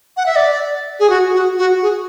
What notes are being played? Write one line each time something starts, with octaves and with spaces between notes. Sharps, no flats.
F#5
E5
D5
G#4
F#4
F#4
F#4
G#4